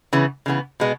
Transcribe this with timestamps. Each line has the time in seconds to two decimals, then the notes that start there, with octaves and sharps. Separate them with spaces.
0.13 C#3 E3 B3
0.46 C#3 E3 B3
0.80 B2 G#3 B3